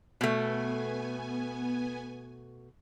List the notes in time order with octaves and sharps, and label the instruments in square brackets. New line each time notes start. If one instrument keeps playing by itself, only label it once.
[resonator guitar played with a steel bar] B2 A3 [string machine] B3 G#5